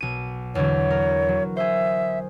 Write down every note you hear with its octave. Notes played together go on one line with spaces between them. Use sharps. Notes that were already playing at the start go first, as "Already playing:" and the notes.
B1 D#7
E2 D3 F#3 C#5
A#4
F#3
G#4 C5 E5